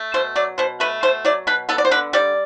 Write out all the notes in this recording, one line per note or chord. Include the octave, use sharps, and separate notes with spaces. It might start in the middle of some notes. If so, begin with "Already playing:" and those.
Already playing: A3
B2 C5
F#3 D5
B2 C5
A3 B4
B2 C5
F#3 D5
B2 B4
B3 A4
D5
C5
D3 B4
G3 D5